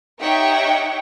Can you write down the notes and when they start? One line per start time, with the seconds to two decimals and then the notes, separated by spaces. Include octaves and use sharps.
0.21 D#4 G4 C#5 E5 F#5 G5